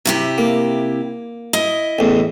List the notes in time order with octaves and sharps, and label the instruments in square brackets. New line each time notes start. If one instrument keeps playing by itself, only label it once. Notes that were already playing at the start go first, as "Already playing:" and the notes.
[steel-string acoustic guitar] C3 E4 G4
[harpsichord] A#3
[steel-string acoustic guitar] E4 D#5
[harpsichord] A1 E2